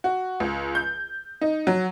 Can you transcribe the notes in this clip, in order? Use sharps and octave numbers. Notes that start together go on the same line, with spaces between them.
F#4
C#2
G6
D#4
F#3